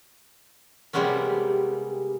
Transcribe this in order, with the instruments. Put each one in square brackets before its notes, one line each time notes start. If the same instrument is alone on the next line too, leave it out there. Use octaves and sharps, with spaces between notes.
[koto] C3 G3 G#3 A#3 B3 C#4